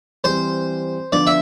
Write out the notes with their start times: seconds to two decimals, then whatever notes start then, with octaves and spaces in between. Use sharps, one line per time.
0.24 E3 G3 C4 C5
1.12 D3 F3 B3 D4 D5
1.27 E5